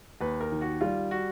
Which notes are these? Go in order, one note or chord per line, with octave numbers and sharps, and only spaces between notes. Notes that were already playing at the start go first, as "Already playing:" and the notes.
D#2 B4
A#4
D#3
F#4
G3 F4
F#4